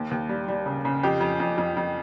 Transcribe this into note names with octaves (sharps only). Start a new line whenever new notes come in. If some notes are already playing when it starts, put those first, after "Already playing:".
Already playing: D#2
D#2
G3
G3
C#3
C#3
F2 G4
F2
F2
F2
F2